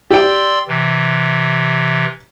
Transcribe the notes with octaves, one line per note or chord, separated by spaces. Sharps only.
G4 D5 G5 C6 E6
C3 E3